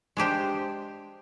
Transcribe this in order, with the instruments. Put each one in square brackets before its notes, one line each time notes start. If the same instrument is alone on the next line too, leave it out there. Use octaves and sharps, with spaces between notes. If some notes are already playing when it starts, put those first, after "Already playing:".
[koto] G#3 D4 G4 C5